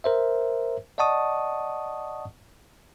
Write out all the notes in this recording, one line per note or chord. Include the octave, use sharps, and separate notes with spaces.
A#4 C5 E5
D5 D#5 F#5 A5 C#6 D#6